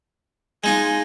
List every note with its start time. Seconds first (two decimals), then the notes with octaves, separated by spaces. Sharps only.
0.64 G#3 D#4 F4 G#5